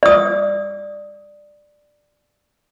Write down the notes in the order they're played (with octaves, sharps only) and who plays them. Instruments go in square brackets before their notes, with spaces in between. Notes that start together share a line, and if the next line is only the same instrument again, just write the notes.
[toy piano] D5 D#6